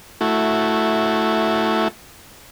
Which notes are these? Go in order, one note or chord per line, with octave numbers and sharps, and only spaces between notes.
A3 E4 F#4